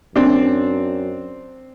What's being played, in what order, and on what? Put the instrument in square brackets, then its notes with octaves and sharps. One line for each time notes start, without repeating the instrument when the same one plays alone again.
[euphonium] F#2 [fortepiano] C4 D4